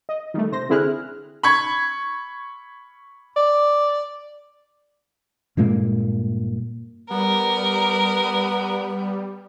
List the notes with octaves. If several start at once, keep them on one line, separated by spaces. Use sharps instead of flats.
D#5
D#3 G3 A3
C3 C5 A#6
D3 C4 E4 G#4 F6 F#6
B5 C#6 G#6
D5
G2 A#2 G#3 A#3
G3 B3 A#4